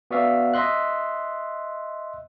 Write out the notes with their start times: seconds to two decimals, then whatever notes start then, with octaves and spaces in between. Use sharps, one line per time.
0.11 B3 F#4 D5 E5 F5
0.54 D#5 E5 C6 F#6